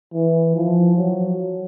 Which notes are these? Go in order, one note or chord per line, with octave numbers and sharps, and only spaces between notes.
E3
F3
F#3